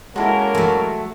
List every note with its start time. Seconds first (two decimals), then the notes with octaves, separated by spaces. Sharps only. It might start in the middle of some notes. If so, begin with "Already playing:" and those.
0.16 G#3 A#3 C#4 E4 F#4 A4 A#4
0.55 F#3 A3 F#4 A4